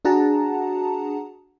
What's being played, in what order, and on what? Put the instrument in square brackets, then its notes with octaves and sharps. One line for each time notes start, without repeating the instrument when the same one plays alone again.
[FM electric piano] D4 F#4 G#4 F#5 A5 A#5